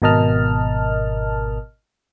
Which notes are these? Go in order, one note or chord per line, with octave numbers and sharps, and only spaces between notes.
G#1 B2 A#4 D#5 A5 F6